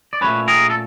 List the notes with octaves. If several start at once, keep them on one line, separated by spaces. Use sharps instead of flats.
D5
A#2 F#3 A3 C#4 B4 C#5
G#4 A#4
A4